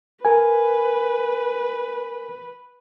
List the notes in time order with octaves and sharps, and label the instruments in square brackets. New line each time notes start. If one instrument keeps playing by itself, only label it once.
[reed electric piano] A#4 G#5 [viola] B4